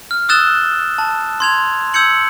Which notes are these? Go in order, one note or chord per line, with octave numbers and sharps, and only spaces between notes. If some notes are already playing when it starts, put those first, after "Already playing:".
F6
D#6 E6 F#6 A6 E7 G7
A5
C6 G#6 F7
E6 G6 G#6 C#7 F#7